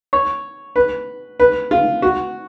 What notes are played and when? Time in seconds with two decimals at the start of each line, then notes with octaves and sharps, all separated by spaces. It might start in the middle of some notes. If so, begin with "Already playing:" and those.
0.13 C#5
0.76 B4
1.40 B4
1.71 F4
2.02 F#4